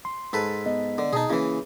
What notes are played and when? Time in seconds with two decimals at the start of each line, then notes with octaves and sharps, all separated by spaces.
0.05 C6
0.33 G#2 A4 B4
0.66 B3 D#5
0.98 D3
1.13 B2 D#4 G#4 A5
1.30 C#3 E3 A#3 C#4 E4